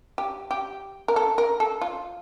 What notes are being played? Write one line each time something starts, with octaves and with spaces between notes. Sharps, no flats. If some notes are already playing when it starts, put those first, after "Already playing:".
G4
G4
A#4
A4
A#4
A4
F4